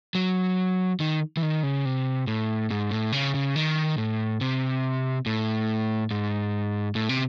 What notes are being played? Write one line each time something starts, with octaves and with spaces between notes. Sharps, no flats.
F#3
D#3
E3
D#3
C#3
C3
A2
G#2
A2
C#3
C#3
D#3
A2
C3
A2
G#2
A2
C3